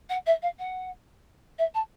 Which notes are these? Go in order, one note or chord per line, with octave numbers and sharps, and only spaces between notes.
F#5
E5
F5
F#5
E5
A5